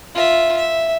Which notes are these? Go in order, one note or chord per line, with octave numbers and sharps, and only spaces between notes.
F4 E5
E5